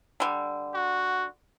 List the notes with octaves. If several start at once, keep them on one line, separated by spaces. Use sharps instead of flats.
D3 G3
F#4